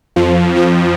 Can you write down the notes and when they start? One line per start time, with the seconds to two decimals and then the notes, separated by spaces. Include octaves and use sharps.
0.16 F2 F3
0.55 F2 F3